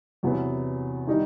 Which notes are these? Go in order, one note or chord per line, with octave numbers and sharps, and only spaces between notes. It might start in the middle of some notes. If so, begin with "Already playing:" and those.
E2 C3 F#3 B3
D#3 G3 D#4